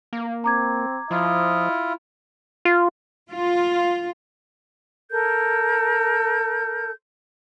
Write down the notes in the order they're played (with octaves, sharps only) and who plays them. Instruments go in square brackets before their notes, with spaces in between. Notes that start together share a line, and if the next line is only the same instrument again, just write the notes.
[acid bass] A#3
[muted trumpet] C4 [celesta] A#5 D6 G#6
[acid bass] F3 [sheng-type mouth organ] E4 F4 [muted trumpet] D#5
[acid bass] F4
[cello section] F4
[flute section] A4 A#4 G6